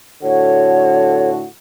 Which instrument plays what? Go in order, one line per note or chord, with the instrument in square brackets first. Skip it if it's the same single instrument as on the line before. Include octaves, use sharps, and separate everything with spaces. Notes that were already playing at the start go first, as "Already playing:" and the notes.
[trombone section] A2 D3 F#4 [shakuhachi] C#5